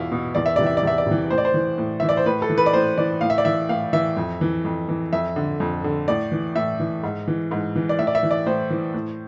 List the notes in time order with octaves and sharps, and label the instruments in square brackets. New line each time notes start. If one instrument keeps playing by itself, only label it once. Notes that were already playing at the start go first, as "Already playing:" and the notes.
Already playing: [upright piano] E2 B2 E4 F4
B2
E2 D5
E5
C3 E3 D5
E5
D5
E2 E5
D5
C3 E3
A2 C5
D5
C5
E3
A2
E3 E5
D5
C5
A2 B4
A4
E3
B4
D5
A2 C5
E3 D5
A2 F5
E5
D5
E3 E5
A2 F5
E3 E5
F2
E3
F2
E3
F2 E5
D3
F2
D3
A2 D5
E3
A2 E5
E3
G#2
E3
G#2
E3
D5
A2 E5
D5
E5
E3
D5
A2 C5
E3
A2